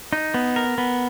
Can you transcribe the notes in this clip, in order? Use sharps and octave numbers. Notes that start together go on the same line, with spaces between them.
D#4
B3
A#4
B3